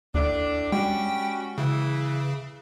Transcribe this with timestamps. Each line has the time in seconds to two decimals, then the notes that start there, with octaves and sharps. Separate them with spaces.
0.14 D#2 A2 A3 D4
0.72 G3 G#3 C#4 F#4 G5
1.58 C#3 E3